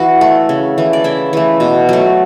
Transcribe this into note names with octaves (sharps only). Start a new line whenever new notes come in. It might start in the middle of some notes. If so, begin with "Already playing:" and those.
Already playing: E3 E4 F#4 F#5
A3
C#3
E3 A3
D5
C#3 E4 E5
E3 A3
B2
F#3 A3